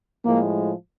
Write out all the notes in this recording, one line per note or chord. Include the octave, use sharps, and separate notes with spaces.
A2 F3 G#3 A#3